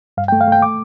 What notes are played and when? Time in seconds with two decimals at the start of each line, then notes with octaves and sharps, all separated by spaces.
0.17 G2 F5
0.28 G5
0.32 A3
0.41 F5
0.48 A3 G5
0.62 D6